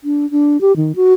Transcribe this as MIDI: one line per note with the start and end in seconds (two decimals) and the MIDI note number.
0.04 0.29 62
0.31 0.60 62
0.61 0.75 67
0.76 0.92 51
0.96 1.13 66